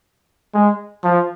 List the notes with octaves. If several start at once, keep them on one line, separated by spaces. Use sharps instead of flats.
G#3
F3